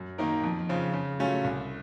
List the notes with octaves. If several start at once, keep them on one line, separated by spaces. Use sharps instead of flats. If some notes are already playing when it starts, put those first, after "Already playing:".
Already playing: F#2
D#3 A#3 D#4 A#4
F2
C#3 F3 C4
C#3
F#3 A3 C#4 F4
C2